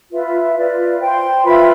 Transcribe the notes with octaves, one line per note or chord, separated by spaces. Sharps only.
F4 B4 E5
F4 B4 D5
C5 G5 C6
F4 B4 E5 B5